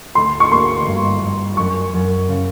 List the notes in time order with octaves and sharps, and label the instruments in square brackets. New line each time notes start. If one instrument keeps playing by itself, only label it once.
[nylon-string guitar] D2 [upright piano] C6
[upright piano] C#6
[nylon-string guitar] A#3 [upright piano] C6
[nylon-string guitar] G2
G2
[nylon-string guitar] F#2 [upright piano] C#6
[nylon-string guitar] F#2
C#3